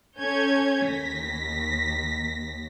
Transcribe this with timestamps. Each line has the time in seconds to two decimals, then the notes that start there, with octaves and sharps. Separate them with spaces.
0.19 C#4 A4 C#5 G#5 G6 G#6
0.89 D#2 A#6 B6